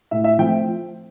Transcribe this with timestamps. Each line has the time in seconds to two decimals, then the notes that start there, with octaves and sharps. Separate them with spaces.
0.11 A2 E5
0.24 E5
0.38 F3 A3 C4 G5